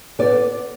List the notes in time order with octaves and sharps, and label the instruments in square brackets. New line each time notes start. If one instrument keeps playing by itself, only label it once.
[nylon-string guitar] B3 D5